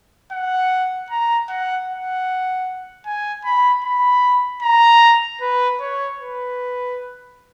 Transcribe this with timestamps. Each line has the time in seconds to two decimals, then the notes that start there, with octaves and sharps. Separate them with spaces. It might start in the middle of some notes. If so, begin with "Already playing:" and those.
0.32 F#5
1.11 A#5
1.49 F#5
1.88 F#5
3.06 G#5
3.45 B5
3.85 B5
4.63 A#5
5.41 B4
5.80 C#5
6.20 B4